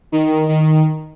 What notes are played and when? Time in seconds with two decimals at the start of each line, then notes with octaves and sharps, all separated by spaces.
0.12 D#3
0.49 D#3